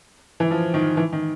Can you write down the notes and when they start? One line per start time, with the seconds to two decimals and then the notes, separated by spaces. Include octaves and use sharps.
0.40 E3
0.51 F3
0.74 D#3
0.97 E3
1.13 D#3